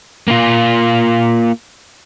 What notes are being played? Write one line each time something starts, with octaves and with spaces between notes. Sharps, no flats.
A#3 F4